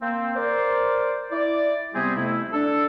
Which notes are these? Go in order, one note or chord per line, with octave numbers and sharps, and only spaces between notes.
A#3 C4
A#4 C5 D5
E4 D5
C3 G3 B3 C4 G4 G#4
F2 C3 A3 E4
D4 A4